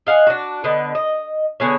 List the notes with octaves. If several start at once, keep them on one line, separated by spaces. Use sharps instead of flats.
D#5 F5 F#5 G#5
D4 F#4
D3 B3 D#5
D#5
D3 B3 G#4 C#5